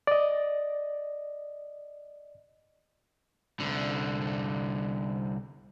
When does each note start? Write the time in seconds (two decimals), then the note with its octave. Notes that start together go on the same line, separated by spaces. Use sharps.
0.07 D5 D#5
3.60 C2 D3